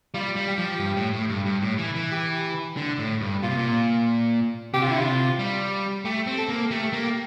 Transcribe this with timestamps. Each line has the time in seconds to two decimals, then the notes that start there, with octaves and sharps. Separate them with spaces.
0.14 G3 F4
0.36 G3
0.47 G4
0.58 F3
0.80 G2
0.97 A2
1.13 A2
1.29 G2
1.46 G2
1.62 A2
1.78 E3
1.95 E3
2.12 G4
2.77 D3
2.99 A2
3.21 G2
3.43 A#2 F4
3.50 C3
3.57 A#2
4.73 C3 G4
4.83 F4
4.87 D3 E4
4.99 C3 F4
5.39 G3
6.05 A3 G4
6.27 C4
6.38 A4
6.49 A#3
6.71 A3 G4
6.93 A#3
7.04 G4